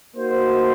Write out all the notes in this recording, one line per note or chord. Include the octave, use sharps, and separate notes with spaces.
A#3 D#4 F#4 C5